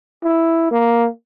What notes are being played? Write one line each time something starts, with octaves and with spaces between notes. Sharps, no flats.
E4
A#3